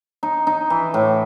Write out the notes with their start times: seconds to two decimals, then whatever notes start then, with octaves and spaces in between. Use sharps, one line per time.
0.23 D#4
0.47 D#4
0.70 E3
0.94 A2